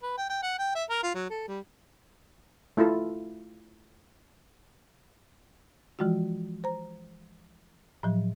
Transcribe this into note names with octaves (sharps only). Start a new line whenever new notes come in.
B4
G5
G5
F#5
G5
E5
A#4
F4
F#3
A4
G3
A3 E4 F4 A4
E3 F3 G#3 F4 F#4
C5 A#5
A2 F3 F#3